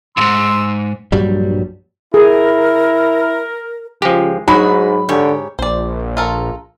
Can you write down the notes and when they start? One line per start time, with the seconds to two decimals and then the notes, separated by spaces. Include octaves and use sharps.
0.17 F2 G#2 C6 E6
1.12 A#1 G2 F#3 G3
2.14 E4 G#4 A#4
4.02 C#2 F3 G#3 G4
4.48 G#2 F#3 D#4 F#4 G#4 B5
5.09 G#2 D3 G4 C#5
5.59 A#1 C5 D5
6.17 F4 A4 A#4